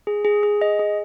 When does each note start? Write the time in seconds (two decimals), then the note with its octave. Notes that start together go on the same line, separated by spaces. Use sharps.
0.07 G#4
0.25 G#4
0.43 G#4
0.61 D#5
0.79 G#4